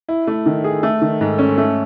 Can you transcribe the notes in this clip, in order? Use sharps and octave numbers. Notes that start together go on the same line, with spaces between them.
E4
A3
D#3
G#4
A3
D#3
G#2
C#4
A3